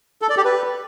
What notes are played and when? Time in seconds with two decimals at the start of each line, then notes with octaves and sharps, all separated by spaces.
0.22 A4
0.29 D5
0.37 G4
0.45 B4